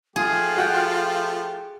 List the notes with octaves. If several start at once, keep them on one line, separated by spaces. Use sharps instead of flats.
F3 A3 F4 G4 G#4
F#4 F#5 G5